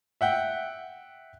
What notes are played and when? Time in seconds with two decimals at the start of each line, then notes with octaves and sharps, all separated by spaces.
0.21 E5 F#5 G5